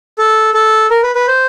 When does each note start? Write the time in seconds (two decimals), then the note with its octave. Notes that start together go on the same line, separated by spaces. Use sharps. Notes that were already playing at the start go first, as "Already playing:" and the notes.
0.18 A4
0.54 A4
0.90 A#4
1.03 B4
1.15 B4
1.28 C5